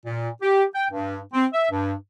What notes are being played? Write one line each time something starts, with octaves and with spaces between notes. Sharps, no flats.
A#2
G4
G5
G2
C4
E5
G2